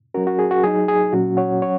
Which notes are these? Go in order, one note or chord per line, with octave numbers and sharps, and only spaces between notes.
F#3 C#4 F#4 A#4
F#4
G#4
F#4
F#3 D#4 G#4
G#4
A#2 F#3 C#4 F#4
C#5 F#5
F#3 C#4 C#5 F#5